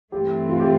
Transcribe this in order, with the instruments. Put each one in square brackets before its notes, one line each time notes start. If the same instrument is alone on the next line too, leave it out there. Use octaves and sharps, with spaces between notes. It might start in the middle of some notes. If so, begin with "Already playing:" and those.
[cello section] G2 E3 A3 C4 [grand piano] G4
[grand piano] F4
G4